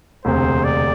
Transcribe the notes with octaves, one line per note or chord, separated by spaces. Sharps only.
E1 D2 C3 C5
D5